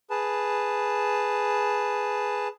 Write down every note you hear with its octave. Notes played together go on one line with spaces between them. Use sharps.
G#4 B4 A5